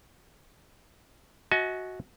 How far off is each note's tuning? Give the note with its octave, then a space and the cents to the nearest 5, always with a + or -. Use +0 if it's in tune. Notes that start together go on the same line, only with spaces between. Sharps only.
F#4 +0 D#5 +40 G#5 +40